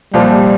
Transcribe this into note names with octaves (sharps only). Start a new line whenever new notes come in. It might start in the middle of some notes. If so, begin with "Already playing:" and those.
C2 A#2 F3 G3